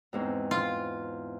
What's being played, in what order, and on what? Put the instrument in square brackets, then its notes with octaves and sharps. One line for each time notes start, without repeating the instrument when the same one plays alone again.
[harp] E2 G#2 C4
[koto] F4